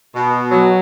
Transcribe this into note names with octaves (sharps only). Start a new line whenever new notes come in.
B2
F#3